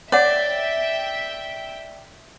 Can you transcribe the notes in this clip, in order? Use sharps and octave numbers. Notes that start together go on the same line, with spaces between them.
C#5 D5 E5 F#5 G5